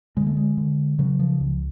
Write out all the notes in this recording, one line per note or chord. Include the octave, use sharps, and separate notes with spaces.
D3 G#3
A3
G#3
D3
C#3 F#3
F3
C#2